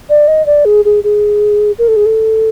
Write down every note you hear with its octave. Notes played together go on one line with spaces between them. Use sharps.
D5
D#5
D5
G#4
G#4
G#4
A#4
A4
G#4
A4